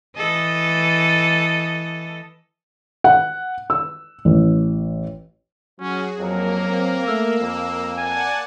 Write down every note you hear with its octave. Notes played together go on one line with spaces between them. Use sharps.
E3 A4 D#5
F#5
E6
A1
F#3 C#4 F#4 G#4
F2 F#3 A#3 A#4
C4
A3 E6
F2
D5 F#5 G#5 A5